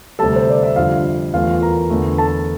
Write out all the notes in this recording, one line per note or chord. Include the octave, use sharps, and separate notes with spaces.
D2 C3 G3 A4 A5
C5
D5
E5
F2 D3 G3 F4 F5
E2 E3 A3 F4 F5
A#4 A#5
E2 D3 A3
A4 A5